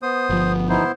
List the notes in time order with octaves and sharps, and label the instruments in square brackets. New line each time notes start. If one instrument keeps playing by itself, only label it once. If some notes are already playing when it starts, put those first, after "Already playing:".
[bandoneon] B3 [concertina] C5 D#6
[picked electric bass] G1 F3
[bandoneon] E3 D#4 [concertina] B3 E4 C5